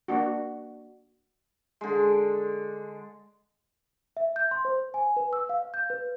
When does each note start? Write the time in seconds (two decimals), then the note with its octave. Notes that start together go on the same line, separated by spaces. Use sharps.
0.08 A#3 D4 F#4
1.81 D3 G#3
4.17 E5
4.36 G6
4.51 C6
4.65 C5
4.94 G#5
5.16 B4
5.33 E6
5.49 F5
5.74 G6
5.90 B4